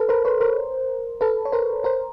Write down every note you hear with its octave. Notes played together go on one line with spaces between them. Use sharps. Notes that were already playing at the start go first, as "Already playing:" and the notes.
Already playing: A4 B4
A#4 C5
B4 C#5
A#4 C5
A4 B4
C#5
A#4 C5
A#4 C5